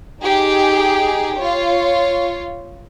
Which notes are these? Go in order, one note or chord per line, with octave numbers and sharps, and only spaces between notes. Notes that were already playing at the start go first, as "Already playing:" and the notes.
D#4 G4 G#4
F4 C#5